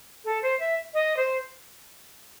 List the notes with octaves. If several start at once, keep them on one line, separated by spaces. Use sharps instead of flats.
A4
C5
E5
D#5
C5